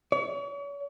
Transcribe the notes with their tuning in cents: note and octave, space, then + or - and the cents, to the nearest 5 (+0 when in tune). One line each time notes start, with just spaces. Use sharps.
C#5 +40